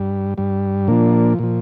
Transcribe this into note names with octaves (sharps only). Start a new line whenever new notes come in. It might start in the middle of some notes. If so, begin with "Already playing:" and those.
Already playing: G2 G3
G2 G3
A#2 F3 A#3 D4
A#2 F3